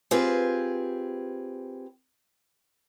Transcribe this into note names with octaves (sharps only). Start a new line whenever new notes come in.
C4 F4 G4 G#4 B4